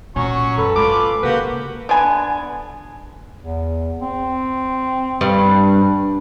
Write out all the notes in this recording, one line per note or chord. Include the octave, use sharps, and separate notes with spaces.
A#2 F#3 C#4 C#6
F#2 A4 B4
G#3 F4 B4 D6
C#3 A#3 F#4 G4 B4 F#5
D3 B3 G#5
E2
C4
G2